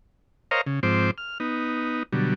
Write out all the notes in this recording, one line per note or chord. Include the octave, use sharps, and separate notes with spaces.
A#4 C5 C#5 D#5 F5 A#5
C#3
G#2 F3 C4 C5 D6
F6
B3 D#4
B2 D3 F#3 G3